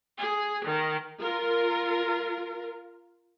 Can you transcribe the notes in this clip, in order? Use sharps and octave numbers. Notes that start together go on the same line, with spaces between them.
G#4
D#3
F4 A#4